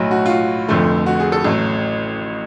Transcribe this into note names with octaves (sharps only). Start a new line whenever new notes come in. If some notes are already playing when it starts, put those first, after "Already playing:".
Already playing: B1 A2 F#3
F#4
F4
F#4
F1 F2 D3 F3 A3
F#4
G#4
A4
A1 F#3 A3